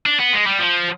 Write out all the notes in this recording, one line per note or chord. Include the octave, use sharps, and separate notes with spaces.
D4
B3
G#3
G3
F3